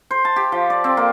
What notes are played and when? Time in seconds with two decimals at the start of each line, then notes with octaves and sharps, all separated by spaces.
0.11 C5
0.25 A5
0.36 G4
0.52 F3
0.70 D5
0.84 C4
0.97 A#3